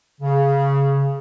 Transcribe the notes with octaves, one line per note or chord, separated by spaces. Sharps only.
C#3